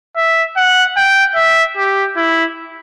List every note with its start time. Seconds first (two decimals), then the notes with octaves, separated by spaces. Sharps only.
0.16 E5
0.56 F#5
0.96 G5
1.35 E5
1.77 G4
2.17 E4